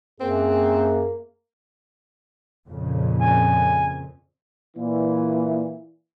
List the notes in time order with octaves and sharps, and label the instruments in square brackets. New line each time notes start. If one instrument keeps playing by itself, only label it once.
[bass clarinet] F#2 [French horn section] A#3 [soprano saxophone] C4 [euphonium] G#4
[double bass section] F2 A#2 C#3
[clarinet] G#5
[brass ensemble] A#2 E3